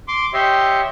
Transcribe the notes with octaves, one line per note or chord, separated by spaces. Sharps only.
C6 D6
G4 C#5 D#5 E5 C6